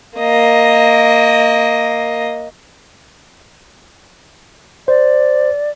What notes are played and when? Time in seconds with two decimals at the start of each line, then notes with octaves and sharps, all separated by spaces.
0.18 A#3 D#5
4.88 C5 D5